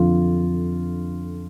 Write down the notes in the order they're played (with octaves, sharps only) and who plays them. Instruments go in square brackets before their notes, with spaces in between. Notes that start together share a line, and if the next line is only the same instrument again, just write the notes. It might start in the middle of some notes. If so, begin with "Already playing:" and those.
Already playing: [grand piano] F2 D3 F3 F4